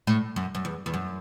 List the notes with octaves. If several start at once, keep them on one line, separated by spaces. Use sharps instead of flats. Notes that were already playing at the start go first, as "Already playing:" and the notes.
A2
F#2
F#2
E2
E2
F#2